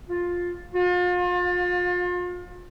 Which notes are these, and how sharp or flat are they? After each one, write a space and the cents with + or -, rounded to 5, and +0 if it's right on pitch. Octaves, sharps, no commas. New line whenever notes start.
F4 +10
F4 +35